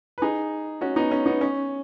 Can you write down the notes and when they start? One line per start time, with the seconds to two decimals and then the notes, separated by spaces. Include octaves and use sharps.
0.18 B4
0.22 D#4 G#4
0.81 C#4 F#4
0.96 B3 D#4
1.11 C#4
1.26 B3 D#4
1.41 C#4